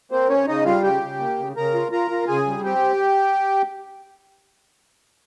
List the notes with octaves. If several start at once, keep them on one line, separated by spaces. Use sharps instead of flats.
A#3 C4 C5
C#3 C#4 C#5
C#3 D#4 D#5
G3 F4 F5
C#3 G4 G5
C#3
A#3
C#3
C#3 A#4 A#5
F4
F4 A#4 A#5
F4
C#3 G#4 G#5
G3
C4 G4 G5